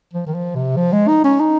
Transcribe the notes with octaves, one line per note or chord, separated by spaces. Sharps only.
F3
D#3
F3
C3
F3
G#3
D#4
C#4
D#4